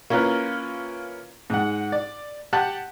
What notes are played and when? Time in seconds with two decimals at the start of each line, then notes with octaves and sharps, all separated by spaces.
0.10 A#3 C#4 E4 F4 A#4 B4
1.50 G#2 F#5
1.92 D5
2.53 G4 F#5 A5 F#6